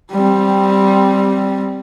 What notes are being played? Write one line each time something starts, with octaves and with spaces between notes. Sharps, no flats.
G3 C4